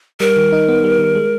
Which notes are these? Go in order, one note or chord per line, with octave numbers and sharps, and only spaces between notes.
G3 A#4
D#3
D#4
B3
G3
D#3
G#3